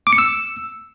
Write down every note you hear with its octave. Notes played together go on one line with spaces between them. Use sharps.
D6
C#7
E6